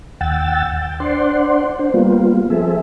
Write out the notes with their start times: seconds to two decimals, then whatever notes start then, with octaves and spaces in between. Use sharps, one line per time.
0.21 D#2 F#5 G5 E6 A6
0.81 G5
1.00 D4 C5 D5 F#5 C6
1.79 D4 C5
1.94 G3 A#3 B3 F4
2.50 F3 C4 G#4 A4 E5